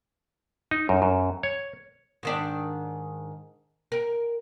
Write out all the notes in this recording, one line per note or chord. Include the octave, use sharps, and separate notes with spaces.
D#4
F#2
F#2
C#5
G#2 D#3 D4
A#4